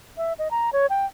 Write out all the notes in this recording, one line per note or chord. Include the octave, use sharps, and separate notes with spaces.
E5
D#5
A#5
C#5
G5